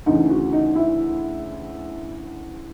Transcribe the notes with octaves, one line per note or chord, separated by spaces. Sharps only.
D2 C#3 E3 D#4
F#4
D#4
E4